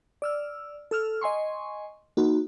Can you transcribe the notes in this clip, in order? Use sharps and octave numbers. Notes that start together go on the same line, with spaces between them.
D5 E6 F6
A4 E6 F6
D#5 G#5 C6 C#6
A#3 D#4 F#4